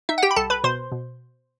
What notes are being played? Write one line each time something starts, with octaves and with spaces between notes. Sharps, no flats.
D#4 E5
F#5
G4 G5
B5
C2 A4 A5
B4 B5
B2 C5 C6
B2